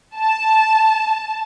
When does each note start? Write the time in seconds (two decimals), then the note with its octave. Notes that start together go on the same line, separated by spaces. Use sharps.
0.16 A5